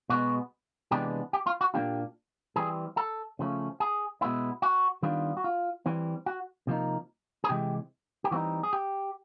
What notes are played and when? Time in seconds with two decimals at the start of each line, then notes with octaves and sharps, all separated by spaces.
0.09 B2 G#3 B3 F#4
0.91 C3 E3 G#3 B3 D4 G4
1.33 G4
1.46 F4
1.61 F#4
1.74 A#2 F3 A#3 D4 F4 G4
2.56 E3 G3 C4 G#4
2.97 A4
3.39 C#3 F3 A3 C#4
3.80 G#4
4.21 B2 G#3 B3 E4
4.62 F#4
5.03 D#3 G3 B3 D4 F4
5.37 F#4
5.44 F4
5.86 E3 G3 C4
6.26 F#4
6.67 C3 F3 A#3 D#4
7.44 G#4
7.49 C3 E3 G#3 G4
8.24 G4
8.31 E3 G3 C4 D#4 F#4
8.63 G#4
8.73 G4